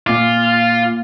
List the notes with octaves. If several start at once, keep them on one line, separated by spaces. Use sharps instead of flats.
A#2 F4 D6